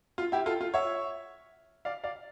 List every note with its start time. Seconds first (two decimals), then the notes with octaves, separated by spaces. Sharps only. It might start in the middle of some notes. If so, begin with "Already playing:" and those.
0.18 F4
0.32 E4 G4
0.46 F4 A4
0.61 F4
0.74 C#5 E5
1.85 D5 F5
2.04 D5 F5